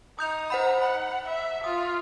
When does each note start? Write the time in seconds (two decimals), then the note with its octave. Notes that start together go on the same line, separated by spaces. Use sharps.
0.19 D#4 D#6 G6 F7
0.50 C5 F#5 B5
0.81 F#5 B5
1.26 E5
1.64 F4 D#6